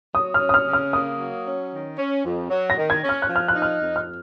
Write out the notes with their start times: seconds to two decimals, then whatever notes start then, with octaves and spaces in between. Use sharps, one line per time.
0.15 F#3 D#6
0.34 F6
0.41 C#4
0.49 D#6
0.54 F6
0.67 C#3
0.73 F6
0.93 A#3 D#6
1.19 F#3
1.45 C#4
1.72 D#3
1.98 C#4
2.25 F2
2.50 F#3
2.70 A#6
2.77 D#3
2.90 G#6
3.03 C#4
3.09 F6
3.22 F#6
3.28 F3
3.36 F6
3.48 F#6
3.55 D#4
3.62 F6
3.81 F2
3.96 F6